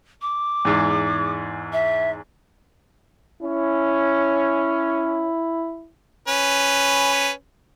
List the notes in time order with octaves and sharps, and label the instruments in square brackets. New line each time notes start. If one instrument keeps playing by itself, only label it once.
[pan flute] D6
[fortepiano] E2 G#2
[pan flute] E5
[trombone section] C#4 [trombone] E4
[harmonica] C#4 B4